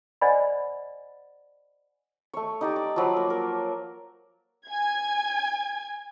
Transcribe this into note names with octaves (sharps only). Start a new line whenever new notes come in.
C5 D5 D#5 F#5 G#5 B5
A3 C#5
D#4 G4 D5
D5
F3 F#3 B5
A#3
A#4
G#5 G#6